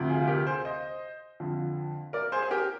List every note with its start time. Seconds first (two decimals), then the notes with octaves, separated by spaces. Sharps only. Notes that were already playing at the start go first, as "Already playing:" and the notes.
Already playing: D2 C3 F3
0.09 F4 G#4
0.22 G#4
0.28 G4 A#4
0.46 G#4 C5
0.65 C5 D#5
1.40 F2 D3 F3
2.13 A#4 D5
2.32 G#4 C5
2.42 G#4
2.51 G4 A#4